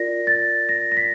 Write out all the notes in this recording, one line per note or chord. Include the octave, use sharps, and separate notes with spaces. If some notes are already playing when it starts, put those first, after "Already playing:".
Already playing: F4 A#4 D5 A#6
A6
A#6
A#6
B6